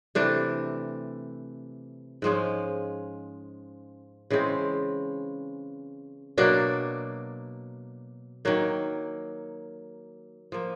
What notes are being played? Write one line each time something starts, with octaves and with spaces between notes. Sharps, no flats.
C3 E3 A3 D4
G#2 F3 G#3 C#4
C#3 E3 G#3 C4
B2 F#3 A#3 D4
D#3 F#3 A#3
F3 A#3